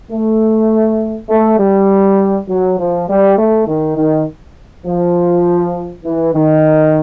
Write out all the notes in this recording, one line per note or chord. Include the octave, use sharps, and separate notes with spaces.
A3
A3
G3
F#3
F3
G3
A3
D#3
D#3
F3
E3
D#3